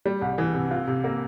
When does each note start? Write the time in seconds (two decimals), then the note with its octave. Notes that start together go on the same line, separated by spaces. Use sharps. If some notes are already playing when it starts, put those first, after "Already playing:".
0.05 G3
0.22 C2
0.38 E3
0.54 C3
0.71 F4
0.87 C3
1.04 A#3